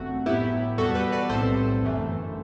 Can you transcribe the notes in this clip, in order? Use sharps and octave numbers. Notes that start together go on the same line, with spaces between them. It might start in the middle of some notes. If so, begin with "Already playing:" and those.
Already playing: G1 F#2 F#3 A3 C4 F#4
A2 F#3 B3 E4 G4
E2 B2 G3 B3 F#4 A4
G4 B4
B4 D5
B1 A2 G3 C4 A4 C5
G1 F#2 E3 A3